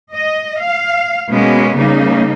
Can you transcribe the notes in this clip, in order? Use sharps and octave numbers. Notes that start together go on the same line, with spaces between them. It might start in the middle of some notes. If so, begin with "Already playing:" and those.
D#5
F5
B2 G#3 A#3 B3 C#4
C#3 G3 A#3 D#4